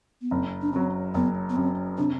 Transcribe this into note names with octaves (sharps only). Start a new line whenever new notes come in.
B3
F#1 C4
D4
F#2 F#3 C4
F#1 B3
B3
F#2 F#3 C4
C3 D4